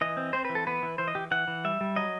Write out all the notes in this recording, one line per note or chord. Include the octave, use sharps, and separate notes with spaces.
E3 D#5
C4
C4 C5
E3 B4
A4
B3 B4
E3
E3 C5
D#5
E3 G4
E3 F#5
E3
G3 E5
G3
F#3 D#5